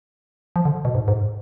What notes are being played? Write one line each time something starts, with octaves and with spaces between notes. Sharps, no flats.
F3
D3
B2
G#2
G#2